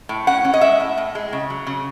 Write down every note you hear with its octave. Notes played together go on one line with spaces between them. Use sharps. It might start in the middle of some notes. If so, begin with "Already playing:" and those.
A2
C#4 F#5
C#4
D#5
G#3 E5
A2
A2
G#3
C#3
F#3
C#3